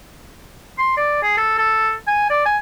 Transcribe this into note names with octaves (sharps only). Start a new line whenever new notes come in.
C6
D5
G#4
A4
A4
G#5
D5
G#5